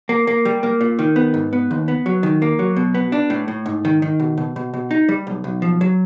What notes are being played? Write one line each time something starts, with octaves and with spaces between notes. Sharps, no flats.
A#3
A#3
G3
A#3
A#2
D#3
B3
G#2
B3
D#2
B3
F#3
D#3
A#3
F#3
B2
B3
D4
A2
A2
G#2
D#3
D#3
B2
B2
B2
B2
D#4
G3
B1
B1
F3
F#3